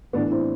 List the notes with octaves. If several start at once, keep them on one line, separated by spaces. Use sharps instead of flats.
A2 E3 B3 D4
C4 E4